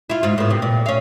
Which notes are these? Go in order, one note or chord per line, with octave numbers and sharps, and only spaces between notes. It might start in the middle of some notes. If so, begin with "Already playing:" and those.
E4 F4
G#2 F4
A2 B3
C3
A#2
C#4 F5